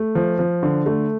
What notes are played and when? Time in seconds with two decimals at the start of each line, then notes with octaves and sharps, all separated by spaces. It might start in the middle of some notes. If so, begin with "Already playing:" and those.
Already playing: A3
0.15 F3
0.39 F3
0.63 D3
0.86 A3